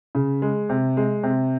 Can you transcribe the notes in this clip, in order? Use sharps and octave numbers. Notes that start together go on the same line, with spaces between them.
C#3
G#3
C3
G#3
C3